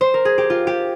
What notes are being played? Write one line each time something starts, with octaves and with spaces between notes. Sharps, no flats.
C5
A#4
G#4
G4
F4
G4